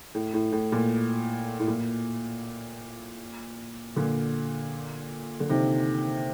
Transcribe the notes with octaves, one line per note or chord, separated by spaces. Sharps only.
A2
A2
A2
A#2
A2
A#2
A#2 D3
D3
C3 D#3